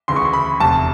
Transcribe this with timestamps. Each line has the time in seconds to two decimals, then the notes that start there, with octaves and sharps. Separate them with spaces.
0.08 D2 C#3 E3 C6
0.16 C#6
0.25 C6
0.33 B5
0.60 F1 E2 C3 A5